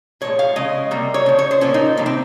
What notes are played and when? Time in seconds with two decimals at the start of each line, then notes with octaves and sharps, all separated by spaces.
0.21 A#2 F3 G#3 C#5
0.39 F5
0.56 C#3 G#3 D#5
0.91 C3 G3 A#3
1.14 C#5
1.26 C#3 F3
1.39 C#5
1.51 C5
1.61 A#2 F3 A#3 C#4
1.74 D#4
1.97 C3 D#3 G3 A#3
2.06 C4